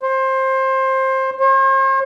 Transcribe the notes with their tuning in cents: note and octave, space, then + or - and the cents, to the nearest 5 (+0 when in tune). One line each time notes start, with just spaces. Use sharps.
C5 +20
C5 +45